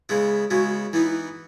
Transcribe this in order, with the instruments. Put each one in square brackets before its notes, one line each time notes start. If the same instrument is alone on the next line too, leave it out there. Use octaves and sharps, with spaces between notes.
[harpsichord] C#3 G#3 B3 E4
[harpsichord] C#3 G#3 B3 E4 [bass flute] F#4
[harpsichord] E3 B3 D#4 [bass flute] E4